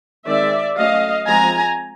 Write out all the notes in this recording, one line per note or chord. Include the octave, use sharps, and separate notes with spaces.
D#3 G#3 C4 D5 E5
F#3 A3 C#4 D#5 F5
F3 G#3 C4 G#5 A#5